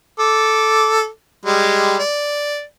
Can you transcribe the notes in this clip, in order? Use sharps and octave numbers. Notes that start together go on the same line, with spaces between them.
A4 D6
G3 G#3 G4
D5